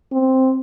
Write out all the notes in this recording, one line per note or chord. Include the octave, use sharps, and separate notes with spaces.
C4